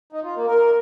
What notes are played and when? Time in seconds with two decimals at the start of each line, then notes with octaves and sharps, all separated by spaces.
0.12 D#4
0.24 F4
0.35 A#3
0.47 A#4